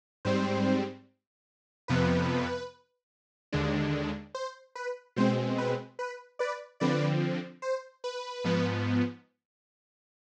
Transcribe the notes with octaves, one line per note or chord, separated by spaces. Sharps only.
G#2 G3 C4 C5
F2 C3 F3 B3 B4
D#2 D3 G#3 D4
C5
B4
B2 G#3 C4 C5
B4
B4
B4 D5
D3 F3 C4 B4 D5
C5
B4
G#2 F3 B3